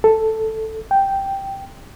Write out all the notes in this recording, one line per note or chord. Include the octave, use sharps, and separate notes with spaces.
A4
G5